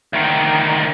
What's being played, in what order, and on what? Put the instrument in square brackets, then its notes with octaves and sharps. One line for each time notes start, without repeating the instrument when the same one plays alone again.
[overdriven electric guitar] D2 D#3